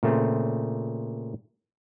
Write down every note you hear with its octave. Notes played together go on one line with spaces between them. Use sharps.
A#2 C#3 A3 C4